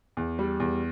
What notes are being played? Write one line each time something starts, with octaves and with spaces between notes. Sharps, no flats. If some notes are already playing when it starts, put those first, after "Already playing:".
E2
G3
E2